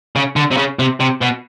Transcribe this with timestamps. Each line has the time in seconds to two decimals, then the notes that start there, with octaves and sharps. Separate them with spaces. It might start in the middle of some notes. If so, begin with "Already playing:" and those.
0.16 C#3
0.36 D3
0.51 C3
0.57 C#3
0.79 C3
1.00 C3
1.21 B2